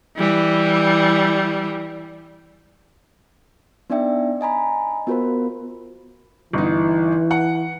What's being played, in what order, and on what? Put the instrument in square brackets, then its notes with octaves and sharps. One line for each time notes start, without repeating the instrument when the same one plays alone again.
[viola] E3 G3
[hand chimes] B3 D4 D#4 D5 E5 G5
D#5 G#5 A#5 B5
B3 F4 F#4 A#4 C5 B5
[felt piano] G1 D#4 [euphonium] E3
[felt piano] F#5